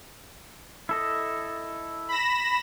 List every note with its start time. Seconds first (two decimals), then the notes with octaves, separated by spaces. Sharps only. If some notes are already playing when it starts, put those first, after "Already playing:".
0.89 E4 A4 D#5
2.08 B5 A#6 E7